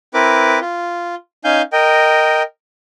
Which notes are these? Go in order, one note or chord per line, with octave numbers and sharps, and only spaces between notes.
C4 E4 A#4 B4 D6
F4
C#4 D#4 F5 G#5 G6
A#4 D#5 G5